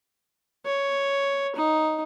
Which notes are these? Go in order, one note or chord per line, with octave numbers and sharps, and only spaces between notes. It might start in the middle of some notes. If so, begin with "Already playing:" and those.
C#5
D#4